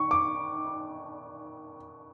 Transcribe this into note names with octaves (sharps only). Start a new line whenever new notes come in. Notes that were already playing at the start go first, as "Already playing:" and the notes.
Already playing: D#3 C#6
D6